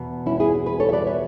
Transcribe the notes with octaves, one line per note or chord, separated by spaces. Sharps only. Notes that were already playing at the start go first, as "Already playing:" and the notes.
Already playing: E2 B2
C#4 E4
E4 G#4
G#4 B4
A4 C#5
E5
B4 D5
C#5 E5